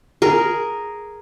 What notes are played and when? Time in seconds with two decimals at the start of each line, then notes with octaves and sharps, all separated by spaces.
0.22 G#4 A#4